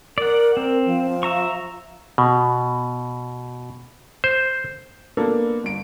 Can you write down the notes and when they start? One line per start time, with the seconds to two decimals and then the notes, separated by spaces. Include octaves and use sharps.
0.18 A#4 D5 F#5
0.57 C4 A#4
0.86 F3
1.23 E5 A#5 C#6
2.18 B2
4.24 C5
5.17 A#3 B3 D4 A4
5.64 G1 D7